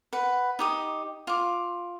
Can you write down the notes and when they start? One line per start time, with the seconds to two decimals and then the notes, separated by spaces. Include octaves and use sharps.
0.13 B4 F#5
0.59 D#4 G4 D#6
1.27 F4 D6